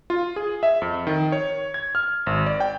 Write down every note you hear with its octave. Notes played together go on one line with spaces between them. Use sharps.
F4
G#4
E5
F2
D#3
C#5
G#6
F6
G#1
D5
G5